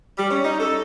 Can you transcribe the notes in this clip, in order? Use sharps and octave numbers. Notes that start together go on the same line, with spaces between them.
G3
C#4
D#4
A4